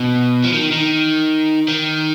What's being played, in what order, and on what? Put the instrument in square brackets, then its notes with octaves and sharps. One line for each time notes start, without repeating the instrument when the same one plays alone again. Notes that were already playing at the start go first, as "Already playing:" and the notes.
Already playing: [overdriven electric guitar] B2
F3
D#3
D#3
D#3